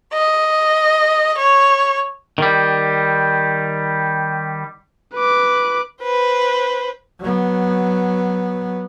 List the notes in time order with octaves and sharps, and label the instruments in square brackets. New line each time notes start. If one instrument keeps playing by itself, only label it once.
[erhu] D#5
C#5
[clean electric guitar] D#3 G3
[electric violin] B4 D6
[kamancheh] B4 C5
[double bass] F#3 B3